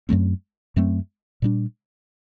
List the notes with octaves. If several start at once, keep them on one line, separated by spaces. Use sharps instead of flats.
F#2 F#3 A3 C4
F#2 F#3 A3 C4
A#2 G3 D4